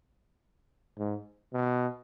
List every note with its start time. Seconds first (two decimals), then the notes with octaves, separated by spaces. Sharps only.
0.99 G#2
1.54 B2